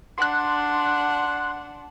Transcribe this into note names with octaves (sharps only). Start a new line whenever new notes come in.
D4 F#5 C6 F#6